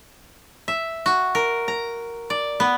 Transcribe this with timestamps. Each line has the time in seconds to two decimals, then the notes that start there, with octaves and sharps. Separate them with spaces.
0.68 E5
1.06 F#4
1.35 A#4
1.68 A#5
2.30 D5
2.60 B3